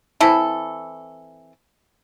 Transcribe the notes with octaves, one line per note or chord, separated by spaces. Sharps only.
E3 C4 E4 A4